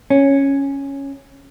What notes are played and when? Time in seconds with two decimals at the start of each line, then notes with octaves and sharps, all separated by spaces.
0.10 C#4